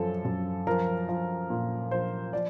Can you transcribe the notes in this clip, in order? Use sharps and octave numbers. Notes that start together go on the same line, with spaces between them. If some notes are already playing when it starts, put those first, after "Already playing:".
Already playing: F#2 F3 A4
F#2
F3 A#4
F3
A#2
F3 C5
F3 D5